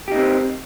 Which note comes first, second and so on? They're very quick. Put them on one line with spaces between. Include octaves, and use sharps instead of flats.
G4 D#4 C4